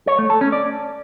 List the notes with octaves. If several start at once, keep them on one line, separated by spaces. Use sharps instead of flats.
C#5
A3
A4
C#4
D5